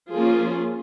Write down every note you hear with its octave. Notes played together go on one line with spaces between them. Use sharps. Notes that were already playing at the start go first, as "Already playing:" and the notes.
F3 A#3 C#4 F4 G#4